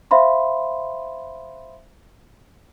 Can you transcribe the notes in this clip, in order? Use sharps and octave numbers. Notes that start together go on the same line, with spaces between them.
C5 E5 F5 B5 C6